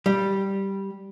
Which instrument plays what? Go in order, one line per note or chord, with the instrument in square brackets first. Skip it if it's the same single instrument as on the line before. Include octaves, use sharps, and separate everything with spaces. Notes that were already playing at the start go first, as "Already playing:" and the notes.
[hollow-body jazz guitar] G3